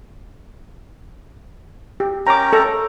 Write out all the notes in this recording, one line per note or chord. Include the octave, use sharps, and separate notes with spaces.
G4
C#4 A#4 G5 A#5 D6
A4 A#5